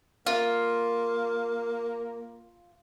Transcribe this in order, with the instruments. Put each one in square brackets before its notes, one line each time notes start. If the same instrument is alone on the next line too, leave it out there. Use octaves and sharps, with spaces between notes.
[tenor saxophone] A#3 [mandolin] F4